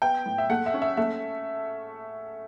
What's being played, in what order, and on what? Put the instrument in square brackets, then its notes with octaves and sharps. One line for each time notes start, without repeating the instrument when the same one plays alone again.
[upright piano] B3 G5
A2
E5
A3 F#5
E5
C#4
E5
A3 E5